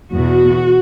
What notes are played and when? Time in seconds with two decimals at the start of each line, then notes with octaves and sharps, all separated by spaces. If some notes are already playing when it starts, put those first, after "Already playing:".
0.12 E2 B2 F#4